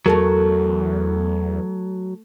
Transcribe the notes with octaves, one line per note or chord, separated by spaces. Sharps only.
E2 F#3 A3 A4 A#4